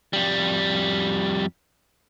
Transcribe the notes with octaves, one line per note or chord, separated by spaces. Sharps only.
F2 G3